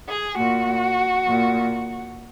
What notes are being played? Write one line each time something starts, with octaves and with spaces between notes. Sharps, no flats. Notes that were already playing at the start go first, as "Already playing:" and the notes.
G#4
A#2 F#4
A#2